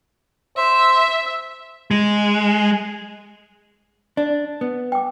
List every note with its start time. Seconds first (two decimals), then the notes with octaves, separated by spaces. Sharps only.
0.57 C5 E5
1.91 G#3
4.17 D4 D5
4.61 B3
4.92 G5 D6